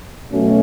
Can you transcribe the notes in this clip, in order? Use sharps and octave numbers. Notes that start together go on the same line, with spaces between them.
B2 F#3 A3 C#4